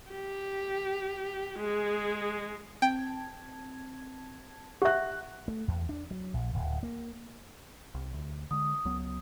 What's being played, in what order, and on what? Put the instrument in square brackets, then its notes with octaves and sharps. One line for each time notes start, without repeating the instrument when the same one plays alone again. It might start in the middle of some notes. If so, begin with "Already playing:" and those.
[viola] G4
G#3 G#4
[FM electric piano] C4 A5 G#6 [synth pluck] G5
[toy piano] G4 E5 [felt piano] F#5 F#6
[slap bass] A3
E2
D4
F#3
A#1
D1
A#3
[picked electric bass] C2
D2
[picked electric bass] D3 G#3 [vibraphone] D#6
[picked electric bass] C#2 F#3 B3